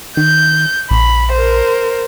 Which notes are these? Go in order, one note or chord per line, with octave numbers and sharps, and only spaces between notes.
D#3 G6
A#1 B5
A#4 C5